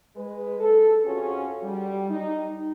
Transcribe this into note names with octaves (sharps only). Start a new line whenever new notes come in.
G#3 B4
A4
F2 C#4 F4 F#4 G#4 C#5
G3
D#4